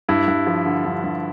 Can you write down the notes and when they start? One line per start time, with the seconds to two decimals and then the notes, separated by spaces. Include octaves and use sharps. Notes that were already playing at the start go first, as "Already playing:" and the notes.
0.09 G2 E4
0.28 G2
0.47 F3
0.66 D3
0.85 G2
1.04 G2